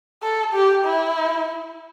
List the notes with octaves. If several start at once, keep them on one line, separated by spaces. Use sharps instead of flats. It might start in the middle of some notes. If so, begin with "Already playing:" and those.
A4
G4
E4